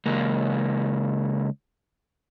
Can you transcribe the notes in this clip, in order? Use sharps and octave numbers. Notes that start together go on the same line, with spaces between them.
C#2 A#3